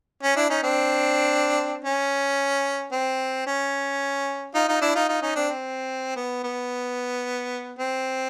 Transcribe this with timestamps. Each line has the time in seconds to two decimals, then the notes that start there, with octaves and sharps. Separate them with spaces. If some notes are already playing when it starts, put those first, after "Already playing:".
0.23 C#4
0.36 D4 E4
0.49 C#4 D#4
0.63 C4 D4
1.85 C#4
2.92 C4
3.47 C#4
4.55 D#4 F4
4.68 D#4 F4
4.82 D4 E4
4.95 D#4 F4
5.09 D#4 F4
5.22 C#4 D#4
5.36 C4 D4
5.49 C4
6.16 B3
6.44 B3
7.79 C4